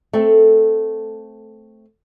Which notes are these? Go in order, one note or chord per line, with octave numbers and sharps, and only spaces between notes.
A3 C4 A4